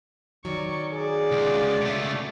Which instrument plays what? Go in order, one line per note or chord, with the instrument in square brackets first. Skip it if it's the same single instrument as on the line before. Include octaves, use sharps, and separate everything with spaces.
[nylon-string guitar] D#3 F#3 [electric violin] D5 C#6
[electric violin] F#4 D5 [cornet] G#4
[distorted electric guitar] C#2
C#3 A3